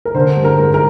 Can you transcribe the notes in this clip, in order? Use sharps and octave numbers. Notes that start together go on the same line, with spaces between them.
A#4
D3 C5
G2
A#4
G#3
A#4